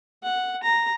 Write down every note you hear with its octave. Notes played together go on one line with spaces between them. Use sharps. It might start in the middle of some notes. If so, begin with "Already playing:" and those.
F#5
A#5